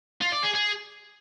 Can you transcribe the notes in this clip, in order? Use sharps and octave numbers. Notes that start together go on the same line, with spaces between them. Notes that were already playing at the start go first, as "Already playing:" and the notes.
F4
D5
G#4
G#4